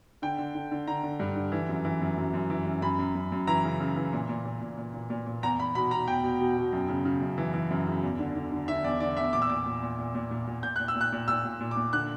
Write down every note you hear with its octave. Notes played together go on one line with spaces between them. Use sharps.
D3 G5
D3
D3
D3
D3 A#5
D3
G2
D3
E3
F#2
E3
F#2
F#2
F#2
E3
F#2
F#2 B5
F#2
F#2
F#2
E3 A#5
C#3
C#3
E3
A#2
A#2
A#2
A#2
A#2
A#2
A#2
A#2
E2 A#5
E2 B5
B2 B5
B2 A#5
E2 G5
B2
B2
B2
F#2
C#3
C#3
F#2
E3
E3
F#2
C#3
E2
D3
D3
D3
D3 E5
E2 D5
D3 D5
E2 E5
A#2 D6
E6
A#2 D6
A#2
A#2
A#2
A#2
A#2
A#2
A#2 G6
A#2 F#6
E6
A#2
F#6
A#2
A#2 E6
A#2
A#2
D6
A#2
D3 F#6